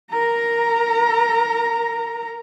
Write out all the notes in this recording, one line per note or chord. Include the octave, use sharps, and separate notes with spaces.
A#4 A#5